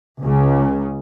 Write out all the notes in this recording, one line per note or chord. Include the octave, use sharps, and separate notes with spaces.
C#2 C#3